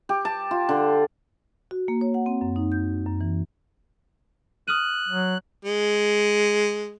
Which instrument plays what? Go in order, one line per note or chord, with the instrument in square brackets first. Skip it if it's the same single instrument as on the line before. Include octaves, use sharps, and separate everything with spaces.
[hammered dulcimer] G4
A5
F4
D3
[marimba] F#4
A#3
C#5
F#5
C4
F#2
D#4
G6
F#2
E3
[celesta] D#6 F6 D#7 [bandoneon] F#6
[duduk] F#3
[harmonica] G#3